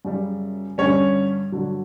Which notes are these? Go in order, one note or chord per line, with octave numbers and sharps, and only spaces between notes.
F#2 C#3 G3
G2 D3 G3 C#4 C#5
G2 D3 F#3